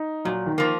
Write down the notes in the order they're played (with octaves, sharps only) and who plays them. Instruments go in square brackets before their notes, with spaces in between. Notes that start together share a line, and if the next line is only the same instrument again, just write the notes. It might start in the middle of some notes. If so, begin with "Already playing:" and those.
Already playing: [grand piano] D#4
[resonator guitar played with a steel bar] A#2 [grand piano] F#3
[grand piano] D#3
[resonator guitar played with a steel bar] F3 A#3